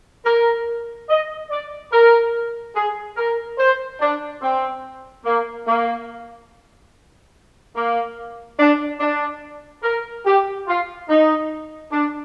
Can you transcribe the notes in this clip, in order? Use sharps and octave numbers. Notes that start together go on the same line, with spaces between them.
A#4
D#5
D5
A#4
G#4
A#4
C5
D4
C4
A#3
A#3
A#3
D4
D4
A#4
G4
F4
D#4
D4